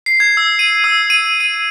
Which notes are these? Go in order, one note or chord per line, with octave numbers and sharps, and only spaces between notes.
C7
G#6
E6
D#7
E6
D#7
D#7